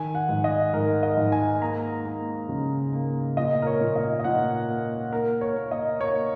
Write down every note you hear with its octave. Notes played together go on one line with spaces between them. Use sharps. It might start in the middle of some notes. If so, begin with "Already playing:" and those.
Already playing: D#3 G#5
F#5
G#2
D#5
G#2 A#4
D#5
G#2
G#5
A#3 A#5
A#3
C#3
A#3
A#2 D#5
A#4
C#5
A#2
D#5
D#5
A#2 F#5
A#3
A#3 A#4
C#5
A#3
D#5
A#3 C#5